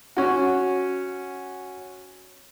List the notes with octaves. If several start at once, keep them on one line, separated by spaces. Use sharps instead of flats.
C#4 F#4